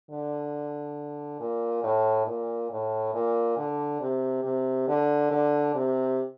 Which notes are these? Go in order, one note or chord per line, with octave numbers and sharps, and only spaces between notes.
D3
A#2
A2
A#2
A2
A#2
D3
C3
C3
D3
D3
C3